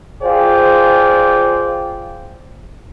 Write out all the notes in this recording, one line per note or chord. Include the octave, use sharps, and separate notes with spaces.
F4 G#4 C5 D5 G5